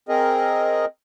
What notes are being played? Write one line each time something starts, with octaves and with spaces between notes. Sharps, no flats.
C4 G#4 A#4 D#5